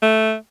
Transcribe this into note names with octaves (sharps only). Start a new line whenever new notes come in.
A3